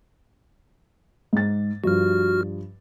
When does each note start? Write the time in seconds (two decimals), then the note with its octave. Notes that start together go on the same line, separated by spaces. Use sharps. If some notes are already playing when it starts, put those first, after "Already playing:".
1.33 G#2 A6
1.84 G2 F3 F#4 F6